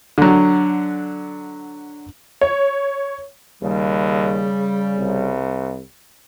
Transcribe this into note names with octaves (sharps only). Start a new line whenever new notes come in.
D3 F#3
C#5
D#2 C#3 G3
C2